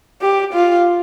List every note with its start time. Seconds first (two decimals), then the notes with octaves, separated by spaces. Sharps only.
0.21 G4
0.53 F4